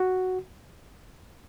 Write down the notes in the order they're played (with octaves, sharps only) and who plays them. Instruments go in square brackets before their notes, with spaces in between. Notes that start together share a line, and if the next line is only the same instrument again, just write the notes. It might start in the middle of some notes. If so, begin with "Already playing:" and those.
Already playing: [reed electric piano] F#4